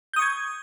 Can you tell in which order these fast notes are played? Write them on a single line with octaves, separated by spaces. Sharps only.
G6 D#6 C#6 G#6